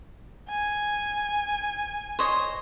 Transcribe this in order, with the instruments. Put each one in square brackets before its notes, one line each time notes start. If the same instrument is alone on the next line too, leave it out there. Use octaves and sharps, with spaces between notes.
[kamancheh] G#5
[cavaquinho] C5 C#5 D#5